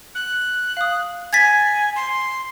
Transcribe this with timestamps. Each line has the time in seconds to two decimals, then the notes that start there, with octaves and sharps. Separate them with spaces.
0.15 F#6
0.77 F5 D#6
1.33 G#5 G#6 A6 B6
1.96 C6